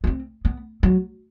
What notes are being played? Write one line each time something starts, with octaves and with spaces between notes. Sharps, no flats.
B3
C4
B3
F#3